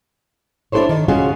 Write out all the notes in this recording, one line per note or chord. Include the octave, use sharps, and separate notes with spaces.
D4 E4 G4 A4 C5 C#5
D#3
C#3 G#3 C#4 F4 F#4 G#4